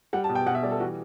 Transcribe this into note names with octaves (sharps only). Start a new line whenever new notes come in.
G3 F#5
A5
B2
G5
B2 F#5
E5
G3 D5
A4
E3 F#4